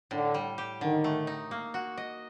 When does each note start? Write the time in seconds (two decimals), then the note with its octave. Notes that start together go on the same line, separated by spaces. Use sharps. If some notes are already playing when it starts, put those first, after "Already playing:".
0.11 A2 D3
0.34 G3
0.58 G4
0.81 D3 D#3
1.04 A3
1.27 D#4
1.51 A#3
1.74 F#4
1.98 D#5